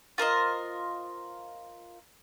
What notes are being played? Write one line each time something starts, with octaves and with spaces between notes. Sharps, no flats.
F4 A#4 C5 D#5